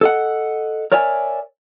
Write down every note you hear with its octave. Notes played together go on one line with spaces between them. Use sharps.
A4 D#5 F#5
A#4 C#5 D5 E5 G#5